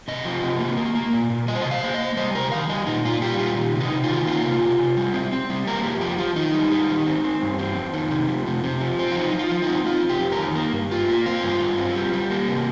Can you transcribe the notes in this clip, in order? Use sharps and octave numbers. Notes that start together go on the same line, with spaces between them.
C3 D#5
F3
C3
A#3
A#3
A#3
A#2
A#2
G3 D#5
C5
D#5
C3
F5
A#3 C5
D#5
A#3
G3 C5
C3 A#4
D#3 F5
G3 D#5
A#2 D#4
A#2 F4
G3 G4
A#2 F4
D#3
C3
D#4
C3
F4
D#3
A#3 F4
C3
C3
C3
G3
C4
C4
G3
A#3 A#4
F2 G4
F3 G4
F3 F4
D#3 D#4
G3
G3
D#3
C4
C4
G2
C4
F2
D#3
C3
F2
C3
C3
F3
C4
F4
F3 D#4
F3
F4
F3
D#4
C4
C4 F4
F2
G4
F2
A#4
D#3
A#3
G2
G2 F4
A#3
C4 F4
G2
G2
C4
G3
G3
A#3
C3